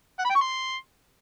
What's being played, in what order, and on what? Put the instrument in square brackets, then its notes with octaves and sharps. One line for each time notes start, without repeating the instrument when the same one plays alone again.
[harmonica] F#5
B5
G5
C#6
C6